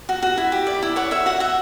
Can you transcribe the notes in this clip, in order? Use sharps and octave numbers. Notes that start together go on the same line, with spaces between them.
F#4
F#4
E4
G4
D5
E4
C#5 F#5
C#5 E5
F#4 F#5
F#4 E5